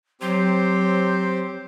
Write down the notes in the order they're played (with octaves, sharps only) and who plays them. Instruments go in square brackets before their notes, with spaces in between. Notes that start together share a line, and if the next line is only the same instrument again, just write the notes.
[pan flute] F#3 [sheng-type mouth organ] C4 G4 C5